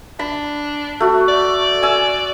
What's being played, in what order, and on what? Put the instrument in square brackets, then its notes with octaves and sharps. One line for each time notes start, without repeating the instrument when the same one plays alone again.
[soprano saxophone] D4 [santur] B5
[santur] A3 F#4
[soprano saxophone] D5
[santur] G#5 E6